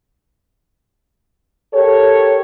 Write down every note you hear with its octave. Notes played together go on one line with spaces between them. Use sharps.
G4 A4 A#4 C#5